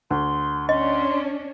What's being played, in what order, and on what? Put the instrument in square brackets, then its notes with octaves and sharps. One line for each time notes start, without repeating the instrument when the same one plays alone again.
[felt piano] D2 [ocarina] C6
[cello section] C#4 D4 [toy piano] D#5 [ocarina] C6